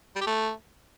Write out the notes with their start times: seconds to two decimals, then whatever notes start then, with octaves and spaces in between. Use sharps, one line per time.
0.16 G3
0.21 G4
0.27 A3